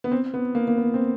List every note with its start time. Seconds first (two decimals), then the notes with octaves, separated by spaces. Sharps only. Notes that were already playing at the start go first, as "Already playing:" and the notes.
0.04 B3
0.12 C4
0.34 B3
0.55 A#3
0.68 A#3
0.77 B3
0.94 C4